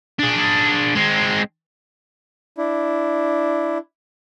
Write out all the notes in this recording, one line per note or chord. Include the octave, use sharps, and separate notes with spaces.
D4 G#4
G#3 C4
D4 E4